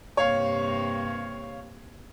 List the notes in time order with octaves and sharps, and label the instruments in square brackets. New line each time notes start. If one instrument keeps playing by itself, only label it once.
[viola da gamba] G2 C3 A#3 [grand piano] C#5 F5